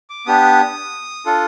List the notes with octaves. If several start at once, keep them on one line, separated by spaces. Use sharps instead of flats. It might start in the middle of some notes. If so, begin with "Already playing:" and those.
D6
B3 D4 G4 D#6
D4 F4 A4